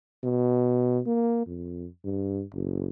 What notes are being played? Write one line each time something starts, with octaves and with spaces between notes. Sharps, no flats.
B2
A#3
F2
G2
F#1